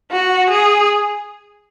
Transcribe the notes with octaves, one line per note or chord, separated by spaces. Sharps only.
F#4
G#4